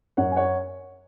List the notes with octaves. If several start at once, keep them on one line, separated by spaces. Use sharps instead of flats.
F#2 C#5 F#5
G#5
C#5 F#5